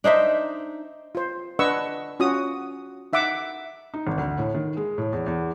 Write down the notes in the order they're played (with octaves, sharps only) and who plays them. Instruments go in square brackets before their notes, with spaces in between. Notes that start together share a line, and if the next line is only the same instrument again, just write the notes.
[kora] D4 D#4 C5 E5
[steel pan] F4 C5
D4 B4 D#5 F#5 C#6 E6
C#4 F4 F#4 D#6
D#4 E5 F#5 D6
[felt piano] D#4
G#1
D2
A2
D#3
G#3
A2
E2
E2